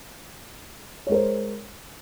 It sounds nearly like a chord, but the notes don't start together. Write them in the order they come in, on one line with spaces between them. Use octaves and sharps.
C#5 G#3 A#4 C5